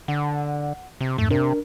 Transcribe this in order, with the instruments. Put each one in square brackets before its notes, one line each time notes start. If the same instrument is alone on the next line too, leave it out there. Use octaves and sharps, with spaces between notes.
[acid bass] D3 [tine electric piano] F#5
[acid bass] C3
[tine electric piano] F2 G#2 [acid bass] A3
[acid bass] C3 [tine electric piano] D4 A#4